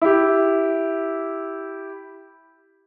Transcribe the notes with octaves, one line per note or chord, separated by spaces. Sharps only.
E4 G4